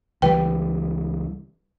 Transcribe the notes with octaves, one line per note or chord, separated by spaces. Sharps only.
C#2 E3 G3 B4 G5